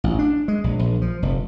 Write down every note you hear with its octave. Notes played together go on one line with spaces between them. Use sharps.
A1
D4
G#3
A#1
A#1
F3
F1